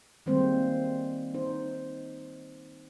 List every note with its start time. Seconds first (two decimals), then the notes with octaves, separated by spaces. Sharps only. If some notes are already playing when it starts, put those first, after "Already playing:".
0.26 D#3 G3 G#3 A#3 C4 C5
1.34 D#4 C5